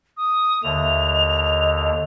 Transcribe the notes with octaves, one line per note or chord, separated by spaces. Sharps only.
D#6
D#2 D3 E5 F7
D#5